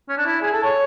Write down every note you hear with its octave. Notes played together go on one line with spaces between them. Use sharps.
C#4
D4
E4
G#4
A4
C#5